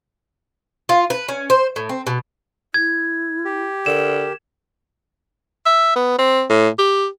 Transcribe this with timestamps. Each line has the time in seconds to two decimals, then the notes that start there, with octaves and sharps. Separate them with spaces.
0.89 F4
1.10 B4
1.28 C#4
1.50 C5
1.76 A2
1.89 C4
2.07 B2
2.74 E4 G#6
3.45 G4
3.86 D3 A#4 E7
5.66 E5
5.95 B3
6.18 C4
6.50 A2
6.79 G4